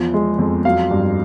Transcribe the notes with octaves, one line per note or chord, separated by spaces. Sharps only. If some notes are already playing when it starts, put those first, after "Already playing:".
Already playing: E2 F3
G#3
F2
F#3 F5
G2